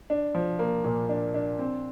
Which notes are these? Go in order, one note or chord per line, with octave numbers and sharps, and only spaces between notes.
D4
F3
A#3
A#2
D4
D4
C4